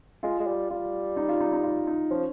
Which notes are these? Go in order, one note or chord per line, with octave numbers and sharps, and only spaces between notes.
G#3 F4
G#3
G3
G3 F4
D#4
F4
D#4
D#4
F4
D#4
F3 C#4